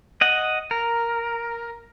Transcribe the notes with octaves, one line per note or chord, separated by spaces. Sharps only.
D#5 F#5
A#4